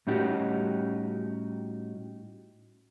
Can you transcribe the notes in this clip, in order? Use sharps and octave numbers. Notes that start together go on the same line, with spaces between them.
A2 G3 C#4 D#4 F#4 G4